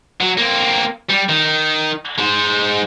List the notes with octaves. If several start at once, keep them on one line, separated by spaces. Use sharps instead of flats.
F#3
A#3 C4
G3
D#3
G#3 C5